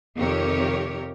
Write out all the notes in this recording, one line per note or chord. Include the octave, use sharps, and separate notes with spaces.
F2 C3 D#3 G4 A#4 C#5